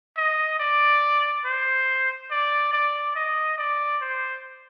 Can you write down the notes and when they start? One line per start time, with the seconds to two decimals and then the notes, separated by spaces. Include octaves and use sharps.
0.17 D#5
0.60 D5
1.45 C5
2.31 D5
2.73 D5
3.16 D#5
3.58 D5
4.01 C5